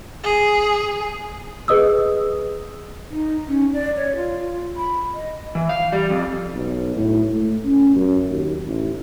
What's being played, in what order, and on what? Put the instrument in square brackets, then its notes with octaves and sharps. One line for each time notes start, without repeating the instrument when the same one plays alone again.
[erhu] G#4
[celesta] G#4 B4 D#5 D#6 E6
[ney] D#4
C#4
D5
C#5
F4
B5
D#5
[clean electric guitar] E3
F5
G3
F2
[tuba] B1
A2
A3
C#4
F#2
D#2
A1